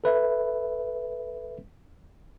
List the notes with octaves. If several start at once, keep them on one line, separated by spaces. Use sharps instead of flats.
A4 B4 E5